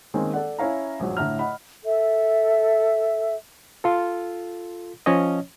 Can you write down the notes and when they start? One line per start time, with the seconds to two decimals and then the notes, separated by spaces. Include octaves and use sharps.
0.14 D#3 G#3 A#3 C4 C#4
0.34 A4 D5 F#5
0.59 C#4 E4 C#5 F5 A#5
1.00 A#1 F#2 F#3
1.17 A2 D3 E5 A#5 F6
1.39 D#5 F#5 B5
1.85 A4 E5
3.84 F4 A4
5.06 F3 C#4 C#5 D#5